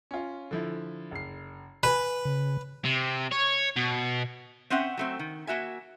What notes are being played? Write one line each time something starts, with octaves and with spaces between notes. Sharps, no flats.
C#4 F4
D3 F3 E4
F#1 C7
B4 G#5
C#3
C3
C#5
B2
C4 C#4 E5 F#5 G5
F#3 A3 C4
D#3
A#3 F#4 E5 G#5